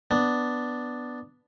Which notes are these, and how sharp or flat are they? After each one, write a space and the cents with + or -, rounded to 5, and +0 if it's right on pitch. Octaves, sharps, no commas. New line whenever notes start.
B3 +0 D4 +0